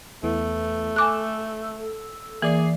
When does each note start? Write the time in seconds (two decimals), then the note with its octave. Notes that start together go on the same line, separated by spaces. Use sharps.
0.23 E2 E3 A3 B3
0.96 A4 G#5 D6 E6 F#6
2.42 E3 A#3 G#4 D5 C7